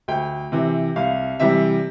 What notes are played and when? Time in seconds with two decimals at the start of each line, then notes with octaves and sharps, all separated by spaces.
0.08 D2 G5
0.52 C3 E3
0.96 C2 F5
1.40 C3 E3 G3 E5